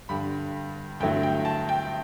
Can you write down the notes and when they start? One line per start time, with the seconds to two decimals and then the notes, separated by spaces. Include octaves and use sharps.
0.09 G2 D3 G3 B5
1.00 G2 D3 F#3 A3 E4 G5
1.23 G5
1.45 A5
1.69 G5